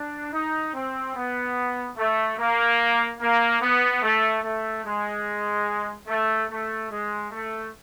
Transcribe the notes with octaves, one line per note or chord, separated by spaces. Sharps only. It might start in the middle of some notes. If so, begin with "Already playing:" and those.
Already playing: D4
D#4
C4
B3
A3
A#3
A#3
B3
A3
A3
G#3
A3
A3
G#3
A3